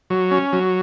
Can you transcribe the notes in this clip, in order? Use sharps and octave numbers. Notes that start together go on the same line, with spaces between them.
F#3
C#4
F#3